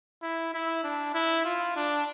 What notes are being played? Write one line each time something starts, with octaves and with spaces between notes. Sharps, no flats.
E4
E4
D4
E4
F4
D4